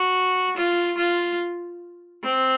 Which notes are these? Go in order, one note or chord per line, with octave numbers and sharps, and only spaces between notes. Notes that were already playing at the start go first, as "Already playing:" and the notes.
Already playing: F#4
F4
F4
C4